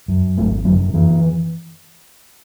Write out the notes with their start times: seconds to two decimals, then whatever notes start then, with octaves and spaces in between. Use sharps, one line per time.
0.08 F#2
0.38 G#1 A3
0.65 F#2 F#3
0.93 F#2 E3